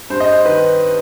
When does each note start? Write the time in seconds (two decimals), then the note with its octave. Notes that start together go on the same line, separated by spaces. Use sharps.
0.10 G2 C5
0.20 D#5
0.33 C5
0.45 D#3 B4